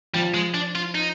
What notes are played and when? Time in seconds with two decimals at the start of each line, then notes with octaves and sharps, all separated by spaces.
0.14 F3 G3
0.34 G#3
0.54 D4
0.76 F4
0.95 D#4